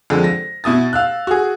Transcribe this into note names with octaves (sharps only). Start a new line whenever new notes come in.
F2 D3 G#3
A#6
B2 E4 D#6 A6
F5 E6 F#6
F#4 G#4